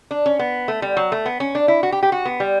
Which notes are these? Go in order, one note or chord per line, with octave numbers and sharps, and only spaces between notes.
D4
C#4
B3
A3
G3
F#3
A3
B3
C#4
D4
E4
F#4
G4
G4
F#4
B3
G3